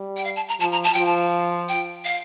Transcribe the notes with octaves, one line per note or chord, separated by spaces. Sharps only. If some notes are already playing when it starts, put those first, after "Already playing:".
Already playing: G3
G5
F5
A5
A#5
F3 A5
A#5
A5
F3 G5
A5
G5
F5